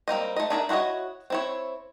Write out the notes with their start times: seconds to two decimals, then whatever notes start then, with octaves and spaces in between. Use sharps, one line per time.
0.08 G3 A#3 C4 D#5
0.36 A3 D#5
0.50 D4 G#4 A#4 E5
0.69 E4 F#4 A4 C#5 D#5
1.30 C4 E4 C#5